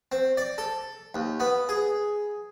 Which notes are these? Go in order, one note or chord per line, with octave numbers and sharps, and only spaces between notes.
C4
D5
A4
D#2
B3
G#4